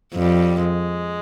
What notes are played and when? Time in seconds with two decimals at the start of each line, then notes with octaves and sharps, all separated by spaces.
0.14 F2 G3
0.57 G#3